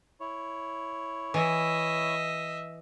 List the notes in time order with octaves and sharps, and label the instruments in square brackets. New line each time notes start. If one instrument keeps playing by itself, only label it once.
[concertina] E4 C#5
[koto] E3 [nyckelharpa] D#5 E5